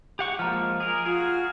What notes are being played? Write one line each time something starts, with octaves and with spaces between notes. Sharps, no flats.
G4 F#5 C#6
F3 G#3 A#3 A#5 F6
G#4 A#4
F4 F#4 G#4